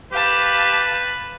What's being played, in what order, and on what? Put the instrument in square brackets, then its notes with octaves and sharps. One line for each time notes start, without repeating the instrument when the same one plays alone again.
[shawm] G4 [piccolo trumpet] B4 [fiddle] F5 A5